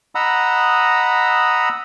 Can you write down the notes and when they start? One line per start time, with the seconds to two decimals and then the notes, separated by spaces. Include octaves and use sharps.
0.15 D#5 F#5 A#5 B5 D#6 E6